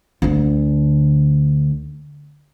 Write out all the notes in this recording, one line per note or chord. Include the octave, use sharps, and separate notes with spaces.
D2 D3